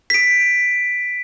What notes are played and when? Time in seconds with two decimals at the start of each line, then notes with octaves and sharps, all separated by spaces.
0.10 B6 D7